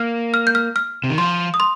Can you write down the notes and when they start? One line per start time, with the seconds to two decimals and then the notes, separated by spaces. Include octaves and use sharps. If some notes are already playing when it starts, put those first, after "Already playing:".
Already playing: A#3 F6
0.34 F6
0.47 G6
0.55 F6
0.76 F6
1.04 C3
1.10 D#3
1.18 F3 C6
1.54 D#6
1.60 C6